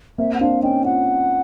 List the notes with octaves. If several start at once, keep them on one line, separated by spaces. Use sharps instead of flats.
A#3 C4 E5
F#5
C4 D4 F5
C#4 D#4 G5
D#4 F4 F#5